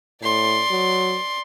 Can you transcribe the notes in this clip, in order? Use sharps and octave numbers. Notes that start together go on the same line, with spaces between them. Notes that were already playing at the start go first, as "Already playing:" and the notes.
A2 D5 C6
F#3